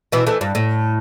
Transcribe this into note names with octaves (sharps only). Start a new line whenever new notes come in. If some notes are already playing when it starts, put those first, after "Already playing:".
B2 E3
E3 A3
G2
A2